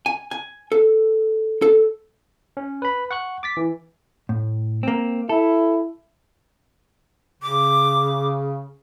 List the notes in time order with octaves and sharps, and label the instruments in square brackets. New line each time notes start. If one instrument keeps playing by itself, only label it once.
[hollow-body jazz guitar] G#5
G#5
A4
A4
[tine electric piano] C#4
B4 B5
F#5 C#6 F#6
D6 A6 B6
E3
[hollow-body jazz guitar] A2
A#3 C4
[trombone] E4 [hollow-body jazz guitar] A4
[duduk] C#3 [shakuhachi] D6